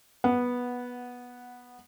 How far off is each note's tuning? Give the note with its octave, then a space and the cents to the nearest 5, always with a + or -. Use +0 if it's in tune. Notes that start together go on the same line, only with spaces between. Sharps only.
B3 -10 F#5 +0